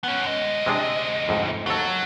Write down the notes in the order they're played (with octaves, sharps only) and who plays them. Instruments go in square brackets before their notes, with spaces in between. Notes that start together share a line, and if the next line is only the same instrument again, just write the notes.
[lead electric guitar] B3 C#4
D2 D#5
[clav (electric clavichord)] C3 G#3 D4
F2 G#2
[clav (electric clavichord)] D#2 A4 [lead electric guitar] F#3